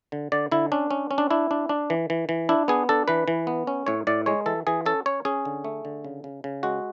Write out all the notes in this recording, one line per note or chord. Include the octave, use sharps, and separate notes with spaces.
D3
D3 D5
D3 E4
C#4 D4
C#4
C#4
D4
D4 E4
D4
D4
E3
E3
E3
D4 E4
B3 G#4
D4 A4
E3 B4
E3
B3
C#4
A2 C#5
A2 D5
G#3 C#5
E3 A4
E3 G#4
C#4 A4
C#4 C#5
C#4 G#4
D3
A3
D3
C#3
C#3
C#3
G#3 F#4